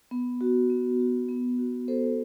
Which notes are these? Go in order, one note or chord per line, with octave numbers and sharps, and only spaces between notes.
B3
F#4
B3
F#4
B3
F#4
B3 A4 C5